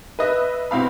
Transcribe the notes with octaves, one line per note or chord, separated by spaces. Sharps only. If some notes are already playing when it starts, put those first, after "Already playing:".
B4 D#5 E5
B2 C4 E4 F5 B5